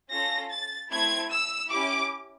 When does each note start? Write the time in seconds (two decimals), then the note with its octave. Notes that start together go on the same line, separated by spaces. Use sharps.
0.11 C#4 F4 A4 A#6
0.51 A6
0.91 A3 C4 E4 G#6
1.31 E6
1.70 C#4 E4 G4 D6